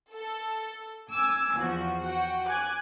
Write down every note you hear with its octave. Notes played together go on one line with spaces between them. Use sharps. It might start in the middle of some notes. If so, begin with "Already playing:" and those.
A4
G#5 D6 E6
E2 F3 F#4
F#4 F#5 G5
G#5 D6 F#6 G#6